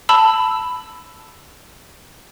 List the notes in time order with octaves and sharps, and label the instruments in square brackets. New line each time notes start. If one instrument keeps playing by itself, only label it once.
[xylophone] A5 B5 E6